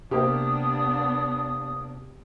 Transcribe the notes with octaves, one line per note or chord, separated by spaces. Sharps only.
C3 A#3 B3 D4 G4 D#6